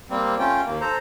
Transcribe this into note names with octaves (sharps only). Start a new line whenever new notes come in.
G3 A#3 C4
A3 C#4 F4 G5
D#2 A#3
A4 C5 A#5